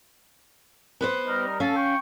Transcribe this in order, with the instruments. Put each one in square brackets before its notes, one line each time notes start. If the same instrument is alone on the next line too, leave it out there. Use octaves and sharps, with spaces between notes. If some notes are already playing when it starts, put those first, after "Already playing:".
[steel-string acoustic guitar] B3 B4 C5
[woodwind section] G3 D#4 A#4
[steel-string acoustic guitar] C#4 F5 [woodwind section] A4
[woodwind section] G5 C#6